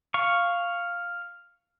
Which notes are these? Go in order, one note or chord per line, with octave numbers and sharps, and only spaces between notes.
F5 C#6